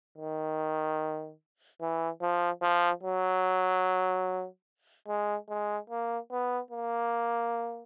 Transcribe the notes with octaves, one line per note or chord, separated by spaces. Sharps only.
D#3
E3
F3
F3
F#3
G#3
G#3
A#3
B3
A#3